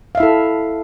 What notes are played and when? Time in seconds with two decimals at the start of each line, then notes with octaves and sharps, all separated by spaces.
0.15 F5
0.17 E5
0.20 E4
0.23 A4